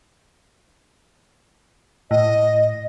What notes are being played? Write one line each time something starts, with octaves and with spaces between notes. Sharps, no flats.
A2 D#5